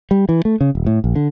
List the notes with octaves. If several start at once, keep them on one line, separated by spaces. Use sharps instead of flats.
G3
E3
A3
C#3
D#1
A2
A#1
D3